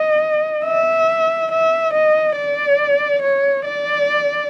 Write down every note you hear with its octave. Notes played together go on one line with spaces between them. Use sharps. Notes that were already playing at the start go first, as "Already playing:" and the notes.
Already playing: D#5
E5
E5
D#5
D5
C#5
D5